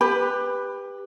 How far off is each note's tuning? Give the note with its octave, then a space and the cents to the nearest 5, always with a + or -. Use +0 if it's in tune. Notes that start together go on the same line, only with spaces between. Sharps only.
G4 +20 B4 +0 B5 +10